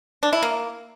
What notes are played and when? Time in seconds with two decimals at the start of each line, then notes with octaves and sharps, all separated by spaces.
0.23 D4
0.33 E4
0.43 A#3